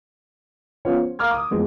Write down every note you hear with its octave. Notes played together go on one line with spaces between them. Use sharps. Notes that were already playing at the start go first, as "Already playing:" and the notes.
F3 B3 C#4 F4 C#5
C5
A#4 F5 A#5 D6 F6 G#6
D6 D#6
F2 E3 G#3 B3